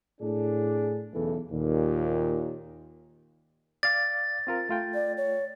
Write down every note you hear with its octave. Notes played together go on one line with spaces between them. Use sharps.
A2 D4 G#4
B1 E2 C#3 E3 A4
D#2 A#2
D5 F5 D6 A6
C4 F4 A#4
A3 F4 G5
D5
C#5